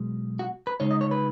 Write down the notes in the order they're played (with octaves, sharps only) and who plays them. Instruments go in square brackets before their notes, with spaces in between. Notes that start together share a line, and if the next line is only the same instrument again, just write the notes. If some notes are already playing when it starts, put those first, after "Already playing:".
Already playing: [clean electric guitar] B1 B2 G#3
F#4
B4
C#2 C#3 G#3 D#4 C#5
D#5
C#5
B4